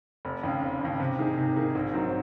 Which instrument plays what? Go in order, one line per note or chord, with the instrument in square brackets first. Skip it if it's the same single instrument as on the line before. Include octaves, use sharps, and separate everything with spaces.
[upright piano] F1
D#2 C#3
F1
D#2 C#3
C3
D#3 A#3 D#4 G#4
C3
D#3 A#3 D#4 G#4
A#1
G#2 F#3 C4 D#4